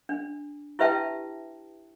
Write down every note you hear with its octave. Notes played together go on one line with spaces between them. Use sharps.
D4
E4 G4 B4 E5 G5 A5